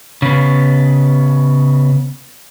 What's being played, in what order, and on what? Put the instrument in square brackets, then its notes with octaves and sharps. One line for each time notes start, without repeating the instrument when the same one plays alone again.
[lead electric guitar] C#3 B3